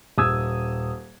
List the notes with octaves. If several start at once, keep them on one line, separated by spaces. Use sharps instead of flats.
D#1 D#6 E6 G#6